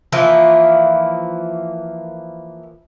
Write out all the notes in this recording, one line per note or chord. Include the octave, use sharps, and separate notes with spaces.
E3 F3 A#3 E4